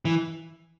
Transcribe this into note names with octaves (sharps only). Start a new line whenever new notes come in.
E3